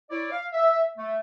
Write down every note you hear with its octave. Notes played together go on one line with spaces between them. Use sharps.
E4 C#5 D5
F5
E5
A3